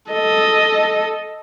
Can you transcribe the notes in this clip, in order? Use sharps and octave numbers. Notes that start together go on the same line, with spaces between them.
A4 D#5